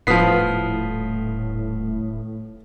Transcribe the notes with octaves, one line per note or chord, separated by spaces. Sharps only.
D#1 A2 F3 B3 D#6 B6 C7